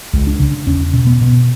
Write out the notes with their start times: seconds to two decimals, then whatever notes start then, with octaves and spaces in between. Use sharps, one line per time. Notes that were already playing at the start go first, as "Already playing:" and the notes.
0.13 C#2
0.27 D4
0.39 C#3
0.67 E2 C#4
0.93 B2
1.07 B3
1.21 B2